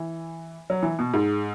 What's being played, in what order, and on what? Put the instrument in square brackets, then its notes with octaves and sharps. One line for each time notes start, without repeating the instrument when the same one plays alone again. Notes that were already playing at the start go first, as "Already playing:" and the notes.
Already playing: [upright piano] E3
F#3
E3
B2
G#2